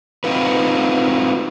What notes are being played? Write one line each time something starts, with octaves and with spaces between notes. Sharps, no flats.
C4 D#4 F4 F#4 B4